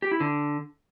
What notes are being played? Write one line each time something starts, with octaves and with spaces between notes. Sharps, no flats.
G4
E4
D3